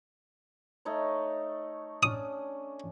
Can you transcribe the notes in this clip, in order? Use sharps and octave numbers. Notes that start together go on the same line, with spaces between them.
A3 D#4 C#5
C#4 D4 D#6